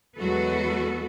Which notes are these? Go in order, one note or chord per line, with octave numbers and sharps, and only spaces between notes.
E2 F#3 G#3 F#4 A4 B4